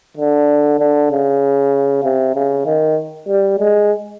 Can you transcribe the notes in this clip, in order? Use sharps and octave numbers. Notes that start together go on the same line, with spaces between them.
D3
D3
C#3
C3
C#3
D#3
G3
G#3